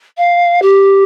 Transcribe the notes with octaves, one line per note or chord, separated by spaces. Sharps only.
F5
G4